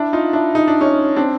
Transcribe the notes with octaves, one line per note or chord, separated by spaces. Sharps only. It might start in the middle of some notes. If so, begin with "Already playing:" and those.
Already playing: D4 E4
D#4 F4
D4 E4
D#4
D4
C#4 D#4
C4 D4